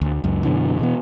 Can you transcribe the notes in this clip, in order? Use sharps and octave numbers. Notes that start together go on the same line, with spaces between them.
D2
C#2 F#2
F#2 B2 D3 E3
B2 E3 B3